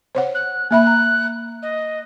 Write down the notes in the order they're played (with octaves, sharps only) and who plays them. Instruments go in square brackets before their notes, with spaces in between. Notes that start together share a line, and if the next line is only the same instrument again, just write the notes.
[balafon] C5 C#5 F#5
[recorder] F#6
[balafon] A#3 E5 B5 [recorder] F#6
[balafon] A#5
[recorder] D#5